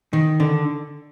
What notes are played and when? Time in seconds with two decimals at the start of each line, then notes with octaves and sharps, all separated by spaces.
0.13 D#3
0.40 D3